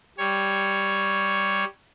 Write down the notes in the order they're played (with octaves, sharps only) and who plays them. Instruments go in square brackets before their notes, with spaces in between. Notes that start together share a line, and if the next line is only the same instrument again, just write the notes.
[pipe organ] G3 C#5